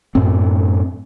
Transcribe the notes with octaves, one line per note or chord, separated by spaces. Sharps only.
F#2 A2 C4